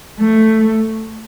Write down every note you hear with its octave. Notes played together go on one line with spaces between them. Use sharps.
A3